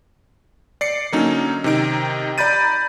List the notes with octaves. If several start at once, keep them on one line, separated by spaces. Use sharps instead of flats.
D5 C7 C#7
D3 F#3 A#3 C#4 D#4
C3 D#3 D#4 D7
D5 A#5 B5 G6 A6 D#7